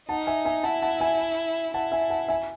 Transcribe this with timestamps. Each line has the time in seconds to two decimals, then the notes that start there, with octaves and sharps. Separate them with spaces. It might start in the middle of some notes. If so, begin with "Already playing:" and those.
0.09 D#4 F#5 A5
0.27 E5 G#5
0.45 E5 G#5
0.63 E4 F#5 A5
0.82 F#5 A5
1.00 E5 G#5
1.74 E4 F#5 A5
1.92 E5 G#5
2.10 F#5 A5
2.28 E5 G#5